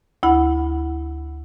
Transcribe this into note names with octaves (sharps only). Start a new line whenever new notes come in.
D2 E4 F#5 B5